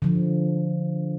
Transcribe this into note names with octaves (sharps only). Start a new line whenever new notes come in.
D3 F3